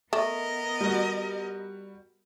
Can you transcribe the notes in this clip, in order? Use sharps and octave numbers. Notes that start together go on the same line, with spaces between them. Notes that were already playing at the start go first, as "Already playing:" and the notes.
A3 B3 A#4 D#5
G3 F#4